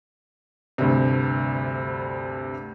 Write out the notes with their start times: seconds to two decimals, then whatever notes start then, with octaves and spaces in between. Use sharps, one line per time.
0.78 D2 G2 C3